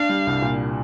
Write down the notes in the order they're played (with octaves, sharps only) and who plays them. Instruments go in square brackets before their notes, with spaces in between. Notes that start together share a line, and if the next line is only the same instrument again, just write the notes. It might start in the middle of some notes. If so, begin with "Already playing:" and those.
Already playing: [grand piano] D4 [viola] F5
[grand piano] G3
C2
A#2